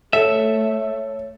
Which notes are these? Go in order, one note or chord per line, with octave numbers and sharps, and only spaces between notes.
A3 A4 C#5 E5